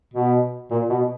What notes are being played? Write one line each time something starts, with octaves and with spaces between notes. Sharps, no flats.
B2
A#2
B2